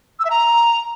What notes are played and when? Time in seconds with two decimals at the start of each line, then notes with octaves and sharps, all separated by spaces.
0.19 E6
0.25 E5
0.30 A#5